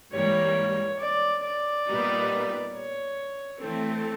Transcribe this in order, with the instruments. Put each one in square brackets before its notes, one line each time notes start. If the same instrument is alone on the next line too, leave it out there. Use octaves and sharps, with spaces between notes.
[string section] G#2 E3 G3 A#3 [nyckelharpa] C#5
[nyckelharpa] D5
D5
[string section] A#2 G3 B3 D#4
[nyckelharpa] C#5
[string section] E3 A3 C4 [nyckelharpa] A4